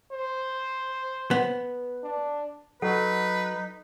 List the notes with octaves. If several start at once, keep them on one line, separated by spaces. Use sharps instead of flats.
C5
B3
D4
F#3 D#4 A4 B4 F#5